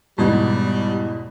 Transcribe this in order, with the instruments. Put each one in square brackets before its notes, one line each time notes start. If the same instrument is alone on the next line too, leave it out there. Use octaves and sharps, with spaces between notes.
[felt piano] E2 G#2 B2 [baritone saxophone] G3